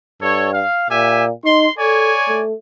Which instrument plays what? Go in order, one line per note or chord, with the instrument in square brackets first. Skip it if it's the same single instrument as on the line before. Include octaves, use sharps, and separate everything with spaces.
[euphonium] G2 [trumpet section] A4 C#5
[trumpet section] F5
[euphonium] A#2 [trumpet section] G4 E5 G#5
[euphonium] D#4 [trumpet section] C6
[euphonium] A4 [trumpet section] C#5 D5 G#5
[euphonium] A3